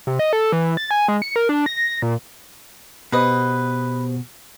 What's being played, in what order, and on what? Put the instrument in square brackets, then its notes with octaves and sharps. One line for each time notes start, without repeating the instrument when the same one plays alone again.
[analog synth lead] C3
D#5
A4
E3
A6
G#5
G#3
C#7
A#4
D4
A#6
A#2
[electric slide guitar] B2 [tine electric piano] B3 G4 C5 [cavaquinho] B4 D#5